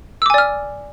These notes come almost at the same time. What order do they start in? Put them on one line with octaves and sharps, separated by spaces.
E6 D6 G#5 D5 F6